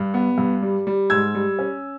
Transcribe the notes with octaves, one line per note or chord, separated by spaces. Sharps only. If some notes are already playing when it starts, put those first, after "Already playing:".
Already playing: G2
B3
G2
G3
G3
G#2 E6 G#6
G3
C#4